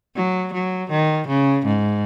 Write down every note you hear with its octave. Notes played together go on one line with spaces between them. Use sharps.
F#3
F#3
D#3
C#3
G#2